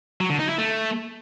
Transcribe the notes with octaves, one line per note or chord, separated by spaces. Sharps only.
F#3
D3
D#4
E4
A3